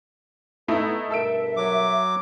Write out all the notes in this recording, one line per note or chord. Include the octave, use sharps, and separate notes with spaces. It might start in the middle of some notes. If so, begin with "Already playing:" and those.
A3 B3 D#4 E4 A4
G2 B2 A4 A#4 E5 E6 D7
F#3 D6